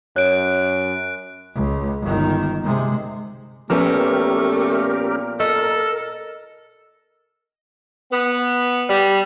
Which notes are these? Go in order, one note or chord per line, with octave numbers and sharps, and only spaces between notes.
F#2 C#5 F#6 D7
C#2
G1 D#3
C3 G#3
A#2 F3 A3 B3 C#4 G4 A#4
A4 A#4 D#5
B3
G3